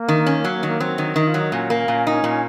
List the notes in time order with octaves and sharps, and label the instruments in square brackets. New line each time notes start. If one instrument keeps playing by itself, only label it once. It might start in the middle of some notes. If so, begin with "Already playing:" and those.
Already playing: [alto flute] A#3
[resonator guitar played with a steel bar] D#3
C#4
F#3
[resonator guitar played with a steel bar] D#3 [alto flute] A#3
[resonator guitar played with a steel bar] F#3 [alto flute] C4
[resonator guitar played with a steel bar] D#3
[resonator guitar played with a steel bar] D#3 [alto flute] D#4
[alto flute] F4
[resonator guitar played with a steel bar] F#3
[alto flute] D#4
[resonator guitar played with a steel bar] A#2 [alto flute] C#4
[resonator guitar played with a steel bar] A#3
A#2
D#4
A#2